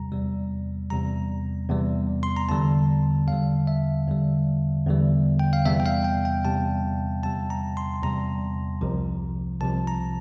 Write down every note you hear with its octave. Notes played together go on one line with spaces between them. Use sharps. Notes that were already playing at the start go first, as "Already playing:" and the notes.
Already playing: E2 C3 G3 A#5
E2 C3 G3
E2 C3 G3 A#5
E2 C3 G3
C6
A#5
E2 D3 G3 A5
E2 D3 G3 F5
E5
E2 D3 G3
E2 D3 G3
G5
F5
E2 C3 G3 E5
G5
F5
G5
G5
E2 C3 G3 A5
E2 C3 G3 A5
A#5
C6
E2 C3 G3 A#5
C2 C3 F3
C2 C3 F3 A5
A#5